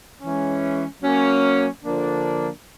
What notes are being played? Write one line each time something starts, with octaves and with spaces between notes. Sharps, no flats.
E3 G#3 C#4
F#3 A#3 C#4
D3 F3 A#3 D4